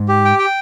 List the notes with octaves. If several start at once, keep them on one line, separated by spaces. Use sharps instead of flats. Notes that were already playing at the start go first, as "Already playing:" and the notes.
Already playing: G#2
G4
G5
G5